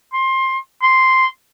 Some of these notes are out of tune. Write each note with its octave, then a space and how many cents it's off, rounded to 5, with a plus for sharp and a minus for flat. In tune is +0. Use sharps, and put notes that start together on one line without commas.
C6 +20
C6 +0